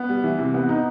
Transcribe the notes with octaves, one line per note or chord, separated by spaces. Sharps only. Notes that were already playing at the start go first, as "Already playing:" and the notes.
Already playing: B3
G3
E3
C3
B3
D#4